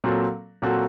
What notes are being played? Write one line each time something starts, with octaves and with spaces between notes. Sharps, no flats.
A#2 F#3 C4 F#4 A4
A#2 F#3 C4 F#4 A4